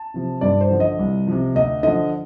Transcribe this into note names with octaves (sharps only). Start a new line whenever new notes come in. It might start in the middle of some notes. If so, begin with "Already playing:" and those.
Already playing: A5
C3 F3
G2 D5
C5
D3 F3
D#5
C2
C3 F3
D2 D#5
D3 F3 D#5